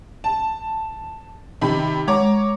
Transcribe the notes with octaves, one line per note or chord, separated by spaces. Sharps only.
A5
C3 D#3 B5
G#3 C#5 A#5 D6